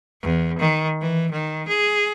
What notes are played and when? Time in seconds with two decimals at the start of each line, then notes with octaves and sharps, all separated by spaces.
0.22 E2
0.59 D#3
1.01 E3
1.32 D#3
1.68 G#4